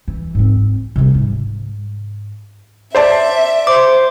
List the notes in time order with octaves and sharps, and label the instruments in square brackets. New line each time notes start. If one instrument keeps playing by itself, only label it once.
[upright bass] E3
G#2 C4
C3 G3
G#2
[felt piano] C5 D5 A5 [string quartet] E5
[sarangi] C5 [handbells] D6